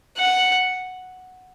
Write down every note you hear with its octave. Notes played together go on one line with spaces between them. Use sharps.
F#5